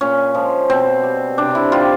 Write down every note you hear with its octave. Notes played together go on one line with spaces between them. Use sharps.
A#2 C#4
F3 G#3
B2 C4
G3
C3 D4
E4
D#3 G3 F4